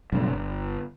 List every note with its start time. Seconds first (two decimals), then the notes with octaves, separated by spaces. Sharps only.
0.12 B1 G2 C#3
0.30 G1